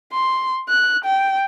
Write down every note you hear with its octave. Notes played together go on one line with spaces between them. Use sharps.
C6
F#6
G5